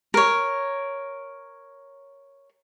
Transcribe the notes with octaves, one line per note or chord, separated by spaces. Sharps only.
A#4 C#5